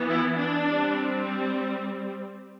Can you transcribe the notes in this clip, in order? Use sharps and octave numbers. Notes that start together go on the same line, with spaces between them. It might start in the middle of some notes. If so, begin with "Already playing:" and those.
Already playing: E3 B3
E4
D4
G3 C4